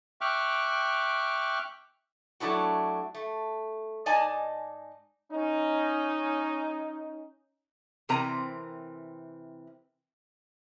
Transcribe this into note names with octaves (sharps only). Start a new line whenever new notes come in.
E5 G5 C#6 D6 F6 F#6
F#3 A3 D4 E4 F#4
A3
G#2 D#4 D5 D#5 G#5 A5
C#4 D#4
C3 E3 C4 A#4 A#5